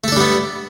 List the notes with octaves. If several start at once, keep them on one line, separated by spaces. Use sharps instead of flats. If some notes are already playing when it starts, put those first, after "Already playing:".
G3 A3 B3 D4 A4